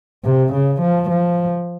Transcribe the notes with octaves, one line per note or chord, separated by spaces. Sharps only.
C3
C#3
F3
F3